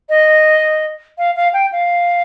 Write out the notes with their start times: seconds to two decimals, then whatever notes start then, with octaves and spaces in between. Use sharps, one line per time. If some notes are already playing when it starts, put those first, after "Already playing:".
0.09 D#5
1.18 F5
1.36 F5
1.53 G5
1.72 F5